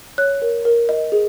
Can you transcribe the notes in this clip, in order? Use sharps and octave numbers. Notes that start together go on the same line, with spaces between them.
C#5 F#6
A#4
A#4
D#5
G#4